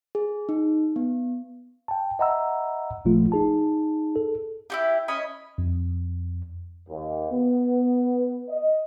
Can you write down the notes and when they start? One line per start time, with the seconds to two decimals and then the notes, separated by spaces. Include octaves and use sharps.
0.15 G#4
0.49 D#4
0.96 B3
1.88 G5 A5
2.19 D#5 E5 F#5 A#5 B5 E6
3.05 G1 A#2 F3 A3 F4
3.32 D#4 G#4 A5
4.16 A4
4.70 E4 F#4 G4
5.08 C#4 D#5 G#5 B5
5.58 F2
6.89 D#2
7.31 B3
8.50 D#5